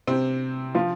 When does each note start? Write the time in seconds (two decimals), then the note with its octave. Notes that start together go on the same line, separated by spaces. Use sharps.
0.07 C3 C4
0.75 F3 F4